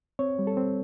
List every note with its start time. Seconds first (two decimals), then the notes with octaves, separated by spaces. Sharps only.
0.19 C4 C#5
0.39 G3
0.47 A4
0.57 C4